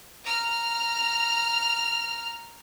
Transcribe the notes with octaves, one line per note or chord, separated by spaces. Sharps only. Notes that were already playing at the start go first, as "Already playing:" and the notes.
A#5 F6